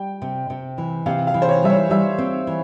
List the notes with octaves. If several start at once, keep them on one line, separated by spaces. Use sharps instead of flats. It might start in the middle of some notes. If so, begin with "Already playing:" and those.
Already playing: G3 G5
C3
C3
E3
C3 F5
F5
E3
C5
C#5
G3 E5
C#5
G3 E5
C4
E3